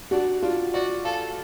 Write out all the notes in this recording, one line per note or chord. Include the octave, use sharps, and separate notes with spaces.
D4 F#4
D4 F4
F#4 D5
A4 F5